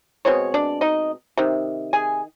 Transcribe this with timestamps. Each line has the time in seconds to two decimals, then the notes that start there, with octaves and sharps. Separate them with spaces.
0.25 B2 G#3 C4 C#5
0.54 D4 D5
0.81 D#4 D#5
1.37 C3 D#3
1.93 G#4 G#5